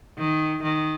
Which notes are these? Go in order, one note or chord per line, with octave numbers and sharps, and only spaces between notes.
D#3
D#3